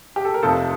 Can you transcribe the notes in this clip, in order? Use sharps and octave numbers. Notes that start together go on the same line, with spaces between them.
G4
A4
A#4
F1 F2 C3 F3 A4 C5